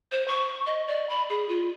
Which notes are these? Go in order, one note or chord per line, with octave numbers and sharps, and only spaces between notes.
C5
C#6
D#5
D5
B5
G#4
F4